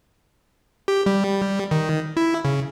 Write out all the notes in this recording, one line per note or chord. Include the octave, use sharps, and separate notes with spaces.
G4
G3
D#3
E4
C#3